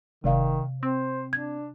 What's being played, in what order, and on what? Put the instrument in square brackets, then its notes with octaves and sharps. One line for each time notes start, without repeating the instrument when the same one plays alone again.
[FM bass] F1 [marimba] C3 D5 F5 [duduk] D#3
[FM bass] C4 [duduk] C5
[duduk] D4 [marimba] G#6